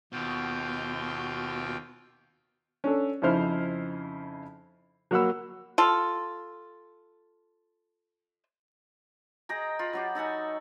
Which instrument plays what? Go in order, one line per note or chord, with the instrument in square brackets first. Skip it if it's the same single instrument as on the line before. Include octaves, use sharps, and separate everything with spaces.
[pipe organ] D#2 F4 G5 [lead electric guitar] B2
[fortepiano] C#4 D4 A4
F2 C#3 D#4 E4 C5 F6
F#3 A#3 F#4 F#5 B5 E6
[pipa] F4 A4
[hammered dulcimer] G#4 D#5 G5 A#5
F4 B5
F#3 F#4 G4
D#4 A4 F#5 G#5